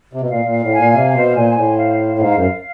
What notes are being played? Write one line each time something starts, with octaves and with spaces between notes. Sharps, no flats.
C3
B2
A#2 F5
A#2
F5
A2
G#5
A#2
C3 F5
B2 C5
A#2 G#5
A2 C5
F5
C5
G#2 F5
F#2 F5